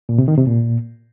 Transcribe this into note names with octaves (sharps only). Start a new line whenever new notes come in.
A#2
C3
D#3
C3
A#2